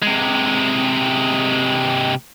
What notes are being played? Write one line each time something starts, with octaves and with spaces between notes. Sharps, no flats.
C3 G#3